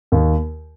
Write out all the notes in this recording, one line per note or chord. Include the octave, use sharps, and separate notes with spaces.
D#2